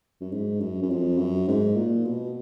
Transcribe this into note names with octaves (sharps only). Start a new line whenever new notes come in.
F#2
G#2
F#2
F#2
F2
F#2
G#2
A#2
B2